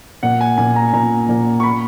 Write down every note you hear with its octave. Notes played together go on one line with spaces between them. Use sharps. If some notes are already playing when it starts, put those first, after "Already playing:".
A#2 F#5
G#5
A#2 G#5
A#5
A#2 A#5
A#2
C#6
B5